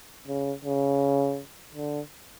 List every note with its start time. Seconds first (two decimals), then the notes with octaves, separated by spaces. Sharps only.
0.28 C#3
0.65 C#3
1.75 D3